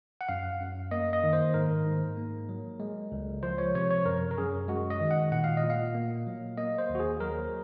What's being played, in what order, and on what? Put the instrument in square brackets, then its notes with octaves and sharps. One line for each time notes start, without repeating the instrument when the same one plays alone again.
[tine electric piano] F#5
F#2 F5
F#2
A#3 D#5
D#5
D#3
C5
G#2 A#4
G#2
A#3
F#3
G#3
C#2
F3 C5
C#5
C3 C#5
C#5
F#2 A#4
A#4
F#2 G#4
G#3 F#4
D#5
D#3
F#5
A#2 F#5
F5
D#5
A#2
F5
A#3
F#3
A#3 D#5
C5
D#2
F#4
G#4
F#3 A#4